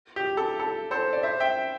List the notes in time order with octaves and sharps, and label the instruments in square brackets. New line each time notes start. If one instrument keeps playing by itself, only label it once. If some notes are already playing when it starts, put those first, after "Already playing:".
[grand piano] G4
A4
A4
A4 C5
D5
C5 E5
E5 G5